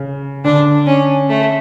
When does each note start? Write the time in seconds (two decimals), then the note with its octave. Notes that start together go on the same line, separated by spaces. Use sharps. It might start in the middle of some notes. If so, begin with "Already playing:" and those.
Already playing: C#3
0.44 D3 D4
0.87 C#4
1.29 A3